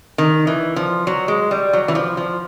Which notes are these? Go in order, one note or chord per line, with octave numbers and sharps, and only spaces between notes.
D#3
E3
F3
F#3
G#3
G3
F#3
E3
F3
F3